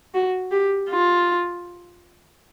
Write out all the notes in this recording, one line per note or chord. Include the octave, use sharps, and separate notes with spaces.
F#4
G4
F4